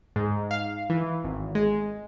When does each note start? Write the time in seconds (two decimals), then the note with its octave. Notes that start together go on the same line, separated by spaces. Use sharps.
0.16 G#2
0.51 F5
0.89 E3
1.24 G#1
1.55 G#3